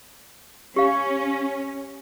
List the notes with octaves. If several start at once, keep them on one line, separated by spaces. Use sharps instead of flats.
C#4 G4 F5